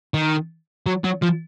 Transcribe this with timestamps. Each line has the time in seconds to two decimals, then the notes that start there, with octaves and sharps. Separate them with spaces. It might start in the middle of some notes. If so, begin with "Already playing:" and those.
0.14 D#3
0.86 F#3
1.04 F#3
1.22 F3